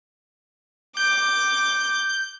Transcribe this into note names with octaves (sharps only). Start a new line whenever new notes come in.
D6 G6